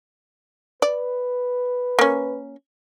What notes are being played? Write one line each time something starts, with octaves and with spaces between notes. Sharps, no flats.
B4 D5
A#3 C#4